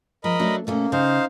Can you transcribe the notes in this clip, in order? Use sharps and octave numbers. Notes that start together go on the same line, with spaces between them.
F3 G#3 A#4 D#5 B5
F#3 A3 D4
B2 A3 A#3 C#4
C#3 D#4 C5 F5